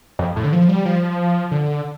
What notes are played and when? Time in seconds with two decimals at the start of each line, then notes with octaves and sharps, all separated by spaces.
0.19 F2
0.36 A2
0.44 D3
0.52 F3
0.69 G3
0.85 F3
1.51 D3